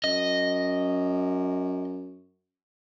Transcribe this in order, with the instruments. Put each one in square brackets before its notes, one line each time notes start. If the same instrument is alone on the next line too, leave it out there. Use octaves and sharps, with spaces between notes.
[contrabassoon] F#2 [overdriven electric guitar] D#5